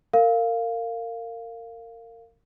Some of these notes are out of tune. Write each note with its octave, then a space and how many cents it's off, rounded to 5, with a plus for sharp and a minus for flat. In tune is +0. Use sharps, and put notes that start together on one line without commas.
A#4 -30 F5 +0